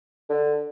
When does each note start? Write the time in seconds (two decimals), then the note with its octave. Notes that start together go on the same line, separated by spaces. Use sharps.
0.29 D3